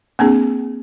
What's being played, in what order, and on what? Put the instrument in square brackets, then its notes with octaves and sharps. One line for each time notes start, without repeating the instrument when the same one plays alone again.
[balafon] A#3 C4 D4 G#4